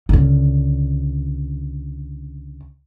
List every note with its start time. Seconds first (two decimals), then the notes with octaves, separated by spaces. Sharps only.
0.09 C#2 D3